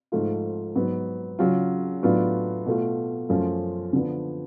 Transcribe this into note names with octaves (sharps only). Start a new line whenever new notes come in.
G#2 F3 A3 F4
G#2 F#3 B3
C#3 F#3 C#4 F4
A2 F#3 B3 D4 F4
B2 A3 F4
F#2 F3 A3 C#4 F4
D3 F3 B3